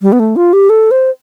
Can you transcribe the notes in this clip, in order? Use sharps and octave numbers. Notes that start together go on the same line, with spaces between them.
G3
B3
A3
F4
G4
A4
C5